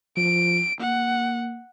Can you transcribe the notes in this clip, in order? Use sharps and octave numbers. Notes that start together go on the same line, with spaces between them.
F3 D7
A#3 F#5